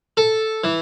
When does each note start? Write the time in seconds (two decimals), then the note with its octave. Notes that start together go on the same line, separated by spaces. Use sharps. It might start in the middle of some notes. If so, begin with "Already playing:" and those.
0.17 A4
0.64 E3